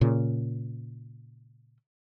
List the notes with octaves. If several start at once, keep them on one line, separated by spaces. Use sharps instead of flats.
A#2 C#3